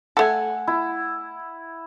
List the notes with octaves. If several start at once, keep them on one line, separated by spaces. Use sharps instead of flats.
A3 A4 F#5 G#5
E4